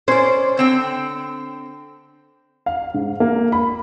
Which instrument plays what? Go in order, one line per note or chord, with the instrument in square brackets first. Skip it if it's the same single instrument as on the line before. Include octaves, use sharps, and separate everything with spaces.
[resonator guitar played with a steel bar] C#4 D5 [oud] C5
[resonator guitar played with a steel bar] D3 C4 G5
[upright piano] F5
G#2
A#3
B5